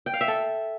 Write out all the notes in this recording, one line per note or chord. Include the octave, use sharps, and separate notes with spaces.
G5
F5
E5
A4